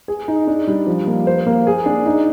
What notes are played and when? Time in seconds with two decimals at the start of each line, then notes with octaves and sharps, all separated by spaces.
0.08 G#4
0.28 D#4
0.47 D4
0.67 G3
0.87 F3
1.07 A#3
1.27 C5
1.46 A#3
1.67 G#4
1.86 D4
2.06 D#4